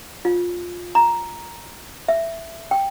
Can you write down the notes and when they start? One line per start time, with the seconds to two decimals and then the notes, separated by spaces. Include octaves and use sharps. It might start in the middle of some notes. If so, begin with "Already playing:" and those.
0.25 F4
0.95 A#5
2.08 E5
2.71 G5